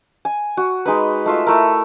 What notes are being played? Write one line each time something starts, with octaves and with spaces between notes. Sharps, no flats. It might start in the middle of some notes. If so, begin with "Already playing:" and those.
G#5
F#4
G#3 D#4 B4
A3 F4 E5
A3 E4 A#4